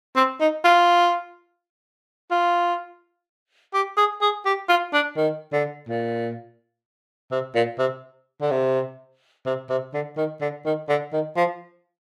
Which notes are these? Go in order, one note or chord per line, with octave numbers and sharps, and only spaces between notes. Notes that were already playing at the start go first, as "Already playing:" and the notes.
C4
D#4
F4
F4
G4
G#4
G#4
G4
F4
D4
D#3
D3
A#2
C3
A#2
C3
D3
C3
C3
C3
D3
D#3
D3
D#3
D3
D#3
F3